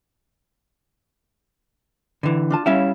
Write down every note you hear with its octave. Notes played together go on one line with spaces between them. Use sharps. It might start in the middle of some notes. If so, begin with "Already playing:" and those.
D3 E3
D4 F4 A5
G3 C#4 E4 C#5 E5 F5